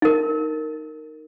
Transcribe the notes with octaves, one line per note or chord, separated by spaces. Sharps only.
D#4 A#4